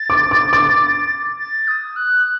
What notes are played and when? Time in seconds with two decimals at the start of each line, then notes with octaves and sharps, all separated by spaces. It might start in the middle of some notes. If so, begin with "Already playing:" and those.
Already playing: A6
0.10 D6
0.31 D6
0.53 D6
1.39 A6
1.68 D#6
1.96 F#6